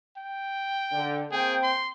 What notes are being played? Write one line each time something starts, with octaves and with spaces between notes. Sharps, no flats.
G5
D3
A#3 C4 G#4 G5
C6